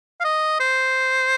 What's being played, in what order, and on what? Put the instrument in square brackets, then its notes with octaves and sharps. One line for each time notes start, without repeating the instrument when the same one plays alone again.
[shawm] F5
D#5
C5